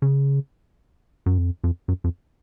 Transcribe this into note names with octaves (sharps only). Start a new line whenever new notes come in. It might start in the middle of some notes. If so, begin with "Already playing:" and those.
C#3
F#2
F2
F2
F#2
F2